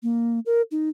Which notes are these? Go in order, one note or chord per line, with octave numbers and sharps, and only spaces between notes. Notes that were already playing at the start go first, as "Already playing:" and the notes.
A#3
A#4
D#4